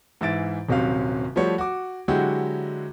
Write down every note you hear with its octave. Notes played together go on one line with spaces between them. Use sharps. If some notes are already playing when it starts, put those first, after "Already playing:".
G#2 E3 E5 A6 D7
D#1 C3 F#3 C4 C#4 F5
F3 G3 A3 F#4 C#5
F#4 D6
D3 F#3 G#3 E4 F#4 G4